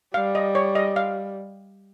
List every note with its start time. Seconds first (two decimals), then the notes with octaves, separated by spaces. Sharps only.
0.14 G3 F5
0.35 D#5
0.55 C#5
0.75 D#5
0.96 F5